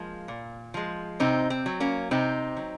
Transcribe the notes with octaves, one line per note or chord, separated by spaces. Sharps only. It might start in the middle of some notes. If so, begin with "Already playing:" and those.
Already playing: F3 G#3 A#3
A#2
F3 G#3
C3 C4 D#4
C4
F#3
A#3 C#4
C3 C4 D#4
F#3